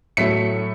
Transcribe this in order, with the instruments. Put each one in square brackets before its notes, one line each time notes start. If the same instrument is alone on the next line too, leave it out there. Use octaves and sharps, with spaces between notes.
[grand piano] A2 F#3 A3 B6 C#7